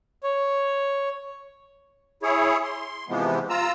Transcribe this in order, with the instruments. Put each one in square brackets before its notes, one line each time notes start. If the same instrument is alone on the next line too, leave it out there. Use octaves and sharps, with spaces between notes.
[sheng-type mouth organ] C#5
[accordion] E4 G#4 C#5
C6
C3 E3 F3 G#3 B3
F4 A#5 E6